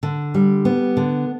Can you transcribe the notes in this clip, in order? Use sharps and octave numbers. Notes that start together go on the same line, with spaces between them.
D3
G3
B3
D3